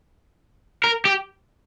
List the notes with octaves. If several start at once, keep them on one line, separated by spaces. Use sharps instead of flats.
A#4
G4